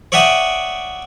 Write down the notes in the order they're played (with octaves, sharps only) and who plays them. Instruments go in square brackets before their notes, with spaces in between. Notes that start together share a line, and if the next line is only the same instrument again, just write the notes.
[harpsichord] C#5 D5 E5 F#5 G5 D#6